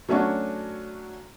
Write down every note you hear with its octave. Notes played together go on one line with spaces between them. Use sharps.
F#3 A3 C#4 D4 F#4